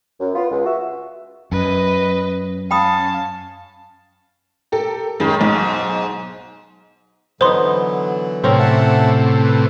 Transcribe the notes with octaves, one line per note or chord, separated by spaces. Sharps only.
F#2
B3 F4
C#2
F#4 E5
F#2 B4 D#5
C#4 F5 G5 A5 B5 D#6
G4 A4 A#4
F#2 D#3 G#3 B5
B1 G#2
D3 E3 F#3 B3 D#4 C5 C6
A2 C3 C4 C#4 A#4
E5 F#5 A5
B4